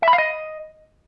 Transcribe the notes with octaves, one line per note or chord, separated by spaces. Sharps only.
E5
B5
F5
D#5